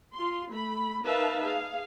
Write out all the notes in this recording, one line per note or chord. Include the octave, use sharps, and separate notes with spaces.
F4 C6
A3 B5
D#4 A#4 B4 E5 F5 A5
G#4 F5